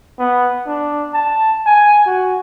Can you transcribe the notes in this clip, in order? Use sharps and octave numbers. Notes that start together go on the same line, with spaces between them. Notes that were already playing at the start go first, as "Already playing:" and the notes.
B3
D4
A5
G#5
F#4